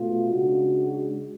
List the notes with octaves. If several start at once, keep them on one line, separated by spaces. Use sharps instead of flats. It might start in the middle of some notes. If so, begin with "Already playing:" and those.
Already playing: B2 A3 F4
C#3 G#3 D4 F#4